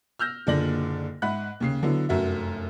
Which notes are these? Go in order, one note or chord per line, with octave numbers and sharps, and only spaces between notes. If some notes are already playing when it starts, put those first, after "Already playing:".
E6 F6 G6 A#6
F#1 A#2 D3 D5 A#6 F#7
G#2 E5 F#5 B5 F#6
D#2 C#3 C7
D3 F#3 B3 E4
F1 F#2 F#4 E5